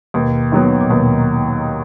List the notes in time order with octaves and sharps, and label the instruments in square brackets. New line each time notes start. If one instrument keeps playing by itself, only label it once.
[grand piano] D#2 [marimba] B2
[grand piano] D#3 F#3 B3
[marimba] A#2
[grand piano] D#2 [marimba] B2